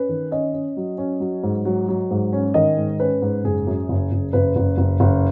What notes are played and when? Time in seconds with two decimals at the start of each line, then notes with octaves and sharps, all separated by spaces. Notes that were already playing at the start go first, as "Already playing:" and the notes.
Already playing: C#4 B4
0.09 D#3
0.31 C#4 D#5
0.54 C#4
0.77 F#3
0.98 C#4
1.20 F#3
1.43 G#2
1.65 F#3
1.88 F#3
2.11 G#2
2.33 C#4
2.54 D#3 D#5
2.77 G#2
3.00 C#4 B4
3.22 G#2
3.44 F#1 G#4
3.67 F#2
3.89 F#1
4.12 F#1
4.33 F#1 B4
4.56 F#1
4.78 F#1
5.00 F#1